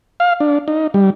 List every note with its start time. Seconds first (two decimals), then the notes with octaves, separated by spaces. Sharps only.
0.20 F5
0.40 D4
0.68 D#4
0.94 G3